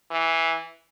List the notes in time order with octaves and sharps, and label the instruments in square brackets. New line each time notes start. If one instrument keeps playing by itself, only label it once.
[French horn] E3